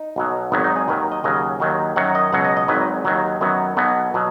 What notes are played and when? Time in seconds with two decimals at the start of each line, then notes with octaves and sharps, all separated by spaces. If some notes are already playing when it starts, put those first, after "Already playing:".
Already playing: D#4
0.16 B1 B2 F#3
0.52 G#1 G#2 D#3 F#3 B3
0.64 D#4
0.76 G#4
0.88 D#2 D#3 F#3 B4
1.12 D#5
1.24 D#2 C#3 F#3 D#5
1.60 D#2 D#3 F#3
1.96 F#2 D#3 F#3 F#5
2.15 D#5
2.32 C#2 B2 F#3 F#5
2.44 D#5
2.57 D#5
2.68 G#1 G#2 D#3 F#3 B4
3.05 D#2 D#3 F#3
3.41 F#2 D#3 F#3 B3
3.77 B1 B2 F#3 B3
4.14 B2 F#3